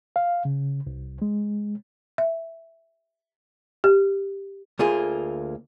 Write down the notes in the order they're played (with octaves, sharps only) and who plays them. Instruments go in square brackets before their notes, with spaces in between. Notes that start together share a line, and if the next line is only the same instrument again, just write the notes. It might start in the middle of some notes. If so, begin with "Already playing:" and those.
[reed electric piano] F5
C#3
C2
G#3
[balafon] E5
G4
[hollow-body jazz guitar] D2 A#3 F4 G#4